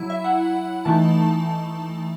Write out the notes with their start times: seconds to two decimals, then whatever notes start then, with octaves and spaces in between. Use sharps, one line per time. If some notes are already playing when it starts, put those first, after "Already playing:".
Already playing: F#3 E4
0.10 E5
0.24 F#5
0.85 E3 A3 D#4 A5